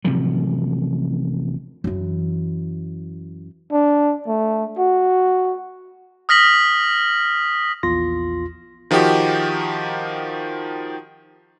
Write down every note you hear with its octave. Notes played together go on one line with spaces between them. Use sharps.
A1 C3 F3 F#3
F#2 E3
D4
A3
F#4
D#6 F6 A#6 B6 F#7
A#1 E2 F4 C6 A#6
D#3 F3 D#4 F#4 G4